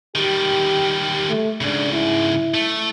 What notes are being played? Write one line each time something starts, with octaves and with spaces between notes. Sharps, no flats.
D#3 G3 G4
A3
G#2 C#3 D4
E4
A3